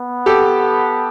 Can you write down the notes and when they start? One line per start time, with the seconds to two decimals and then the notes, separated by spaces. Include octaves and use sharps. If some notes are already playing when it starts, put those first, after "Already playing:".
Already playing: B3
0.26 G4 A4